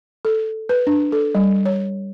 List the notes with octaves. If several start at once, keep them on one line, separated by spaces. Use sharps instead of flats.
A4
B4
D4
A4
G3
C#5